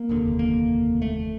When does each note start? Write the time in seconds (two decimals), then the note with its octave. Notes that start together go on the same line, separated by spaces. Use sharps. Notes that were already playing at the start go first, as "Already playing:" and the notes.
Already playing: A#3
0.09 F1 D#2 D3
0.39 A#3
1.02 A3